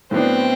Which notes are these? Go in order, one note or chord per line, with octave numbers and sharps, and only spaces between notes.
A2 F#3 B3 C4 D4